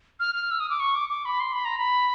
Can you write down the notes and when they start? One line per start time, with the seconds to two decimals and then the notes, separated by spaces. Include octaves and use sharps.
0.20 F6
0.35 F6
0.51 E6
0.60 D#6
0.70 D6
0.80 C#6
0.95 D6
1.09 D6
1.25 B5
1.40 C6
1.52 B5
1.65 A#5
1.78 B5